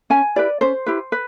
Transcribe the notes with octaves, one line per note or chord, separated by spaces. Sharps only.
C#4 G#5
E4 G4 B4 D5
C#4 C5
E4 G4 B4
B4